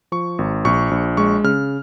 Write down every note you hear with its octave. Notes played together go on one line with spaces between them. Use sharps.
F3 C#6
G#1
A#1 C#6
A#1
G#3 C#6
C#3 F6